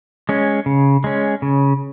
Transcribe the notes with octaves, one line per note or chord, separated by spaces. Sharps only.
G#3 C#4
C#3
G#3 C#4
C#3